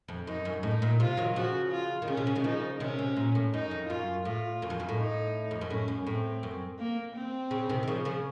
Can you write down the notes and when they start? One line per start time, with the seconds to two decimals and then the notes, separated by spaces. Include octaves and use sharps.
0.08 F2
0.27 F#2 D#4
0.45 F#2
0.63 A2 D#4
0.82 A#2
1.00 C3 F4
1.17 D#3 F#3
1.36 C#3 F3 F#4
1.71 F4
2.02 D#3
2.08 C#3 C#4
2.17 C3
2.27 C#3
2.35 C3 D#3
2.44 C#3 F3 D#4
2.80 C3 D#3 C#4
2.99 C3
3.17 A#2
3.35 A2
3.54 F#2 D#4
3.71 F2
3.89 F#2 F4
4.25 A2 F4
4.62 F#2
4.70 F2
4.80 F#2
4.89 A2
4.98 D#4
5.51 F2
5.61 F#2
5.70 A2 C#4
5.88 F#2
6.06 A2 C4
6.43 F#2
6.79 A#3
7.16 C4
7.51 C#3
7.69 C3 D#3
7.83 D#3
7.88 C#3 F3
8.05 C#3 F3